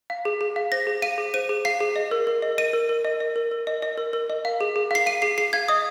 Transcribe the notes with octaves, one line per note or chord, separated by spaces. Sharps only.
F5
G#4
G#4
F5
C5 A#6
G#4
F5 D#7
G#4
C5 D#7
G#4
F5 C7
G#4
D#5
A#4
A#4
D#5
D#5 D#7
A#4
A#4
D#5
D#5
A#4
A#4
D#5
D#5
A#4
A#4
D#5
F5
G#4
G#4
F5 C7
F5 D#7
G#4 C7
G#4 C7
F5 G#6
D#5 D#6